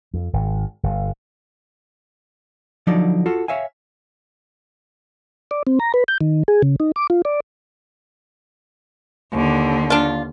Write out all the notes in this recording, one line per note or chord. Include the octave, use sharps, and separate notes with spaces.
F2
G#1
G1
D3 F3 F#3 D#4 D5
F4 F#4 A4
C#5 E5 F5 G#5
D5
C4
A#5
B4
G6
D#3
G#4
C#3
D#4
D6
F4
D5
D#2 D3
D4 F4